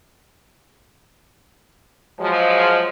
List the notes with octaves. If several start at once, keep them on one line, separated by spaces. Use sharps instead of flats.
F3 F#3 G#3